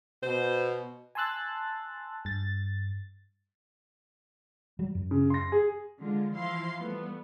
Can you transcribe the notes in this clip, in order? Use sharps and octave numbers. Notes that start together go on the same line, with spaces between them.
B2 C5
G#5 A5 C6 E6 F#6 A6
G2 A6
F#3 G3
F#2
C#3
C6 A#6
G#4
D3 G#3 F4
E3 F3 E4 F5 C6
G3 A3 B3